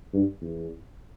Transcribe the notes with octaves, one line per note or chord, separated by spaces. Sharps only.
G2
E2